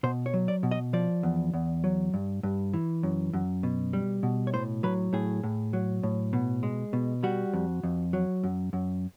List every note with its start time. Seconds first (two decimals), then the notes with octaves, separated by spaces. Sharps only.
0.03 B2 C5
0.26 C#5
0.34 F#3
0.48 D5
0.63 B2
0.71 D#5
0.93 F3 D5
1.23 E2
1.54 E2
1.84 F#3
2.14 G2
2.43 G2
2.74 E3
3.03 F#2
3.33 F#2
3.63 B2
3.93 G3
4.23 B2
4.47 C#5
4.53 A2 C5
4.83 F#3 B4
5.13 A2 G#4
5.43 A2
5.73 F#3
6.03 A2
6.33 B2
6.63 G#3
6.93 B2
7.23 G3 F#4
7.53 F2
7.83 F2
8.13 F#3
8.44 F#2
8.73 F#2